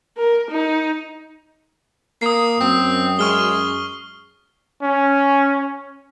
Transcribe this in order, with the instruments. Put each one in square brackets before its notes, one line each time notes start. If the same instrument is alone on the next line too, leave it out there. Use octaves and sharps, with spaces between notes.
[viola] A#4
D#4
[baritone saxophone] A#3 [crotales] D#6 C7
[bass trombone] F#2 [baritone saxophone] C4
[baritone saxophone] G#3 [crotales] C#6 F6 G7
[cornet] C#4